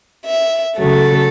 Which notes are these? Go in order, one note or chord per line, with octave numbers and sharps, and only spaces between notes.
E5
C#3 F#3 A3 A4